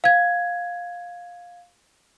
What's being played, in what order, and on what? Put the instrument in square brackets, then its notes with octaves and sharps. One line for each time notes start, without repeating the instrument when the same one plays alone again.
[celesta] F5 G#6